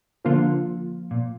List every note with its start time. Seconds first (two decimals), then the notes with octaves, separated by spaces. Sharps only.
0.25 D3 F3 A#3 F4
1.11 A#2